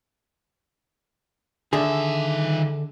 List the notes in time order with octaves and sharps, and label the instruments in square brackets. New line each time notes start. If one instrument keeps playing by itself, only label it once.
[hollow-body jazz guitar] D3 G#4 [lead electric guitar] D#3 E5